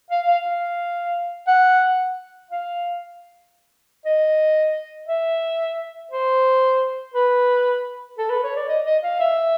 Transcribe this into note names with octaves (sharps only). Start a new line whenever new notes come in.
F5
F5
F5
F#5
F5
D#5
E5
C5
B4
A4
B4
C#5
D5
D#5
D#5
F5
E5